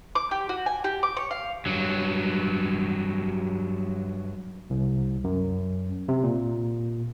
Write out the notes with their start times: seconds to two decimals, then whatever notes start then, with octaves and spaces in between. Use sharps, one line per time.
0.15 D6
0.31 G4
0.49 F#4
0.66 G#5
0.84 G4
1.03 D6
1.17 C#5
1.31 F5
1.66 G2 F#3
4.70 C2
5.24 F#2
6.08 C3
6.23 A#2